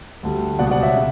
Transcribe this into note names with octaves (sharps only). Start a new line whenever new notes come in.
D2 D3 G3
C#2 B2 G3 D5 F#5
D5 F#5
C#5 E5
C#3